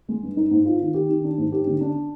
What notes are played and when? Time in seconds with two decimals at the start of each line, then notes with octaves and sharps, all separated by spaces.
0.09 G#3
0.23 G2
0.37 D#4
0.51 G#2
0.65 F4
0.80 D#3
0.94 G4
1.09 D#3
1.24 D4
1.38 G#2
1.52 G4
1.67 D3
1.81 D4